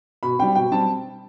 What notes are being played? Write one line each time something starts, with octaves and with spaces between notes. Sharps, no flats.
B2 B5
G3 C4 G5
B2 G5
G3 C4 A5